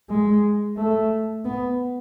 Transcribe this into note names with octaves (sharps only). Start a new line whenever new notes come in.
G#3
A3
B3